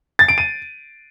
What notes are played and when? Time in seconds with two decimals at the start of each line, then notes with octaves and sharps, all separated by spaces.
0.19 A6
0.28 D7
0.38 D#7